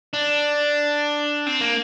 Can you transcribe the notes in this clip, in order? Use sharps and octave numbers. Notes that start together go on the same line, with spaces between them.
D4
C4
A#3